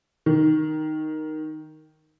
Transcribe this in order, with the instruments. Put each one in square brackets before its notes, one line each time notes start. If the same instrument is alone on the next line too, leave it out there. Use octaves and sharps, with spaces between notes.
[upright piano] D#3